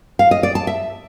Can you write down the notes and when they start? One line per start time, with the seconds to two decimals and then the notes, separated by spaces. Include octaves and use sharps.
0.19 F5
0.31 D#5
0.43 D5
0.55 A5
0.67 E5